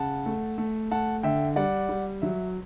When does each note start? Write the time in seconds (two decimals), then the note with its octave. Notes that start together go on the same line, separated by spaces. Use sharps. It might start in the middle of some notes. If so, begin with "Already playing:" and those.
Already playing: C#3 F#5 A5
0.26 A3
0.58 A3
0.91 A3 F#5 A5
1.23 D3 E5 G5
1.56 G3 D5 F#5
1.89 G3
2.22 F#3 E5